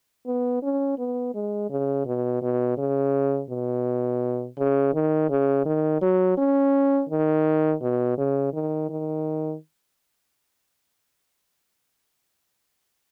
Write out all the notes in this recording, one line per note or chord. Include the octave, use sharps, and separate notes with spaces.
B3
C#4
B3
G#3
C#3
B2
B2
C#3
B2
C#3
D#3
C#3
D#3
F#3
C#4
D#3
B2
C#3
D#3
D#3